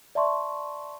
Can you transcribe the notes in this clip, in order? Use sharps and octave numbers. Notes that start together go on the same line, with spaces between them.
D5 E5 A5 C6 C#6